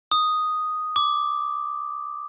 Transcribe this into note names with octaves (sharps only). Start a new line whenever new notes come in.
D#6
D6